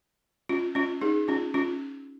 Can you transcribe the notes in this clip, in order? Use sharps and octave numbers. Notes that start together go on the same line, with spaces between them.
C#4 F4
C#4 F4
D#4 G#4
C#4 F4
C#4 F4